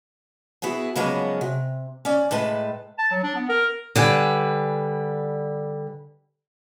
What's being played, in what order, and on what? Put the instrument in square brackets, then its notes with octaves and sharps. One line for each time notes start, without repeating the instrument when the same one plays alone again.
[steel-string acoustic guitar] B3 E4 F#4 G#4
C#3 F3 F#3 G#3 A#3 B3
C3
C#4 D5
A2 G#3 B4 A5
[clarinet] A5
F#3
D4
B3
A#4
[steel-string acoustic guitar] D3 G3 B4 G#5